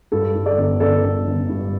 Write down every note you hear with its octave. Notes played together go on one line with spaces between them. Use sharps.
G2 A4
G2
A4 D5
G1
G1 A4 D5
G1
G1
G2